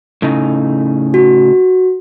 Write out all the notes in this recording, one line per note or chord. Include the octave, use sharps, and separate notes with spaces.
A2 C#3 D#4
F#4